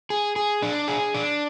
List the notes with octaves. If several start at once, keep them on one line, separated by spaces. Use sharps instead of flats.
G#4
G#4
D4
G#4
D4